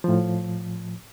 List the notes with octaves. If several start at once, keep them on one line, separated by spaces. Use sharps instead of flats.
A2 F3